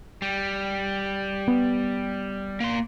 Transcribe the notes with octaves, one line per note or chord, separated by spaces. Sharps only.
G3
B3
A#3 C6